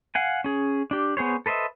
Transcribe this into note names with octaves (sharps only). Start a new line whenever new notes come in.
F5 F#5 G#5
C#4 G#4
D4 G4
B3 G#4 C5 C#5
A4 B4 C5 D#5 E5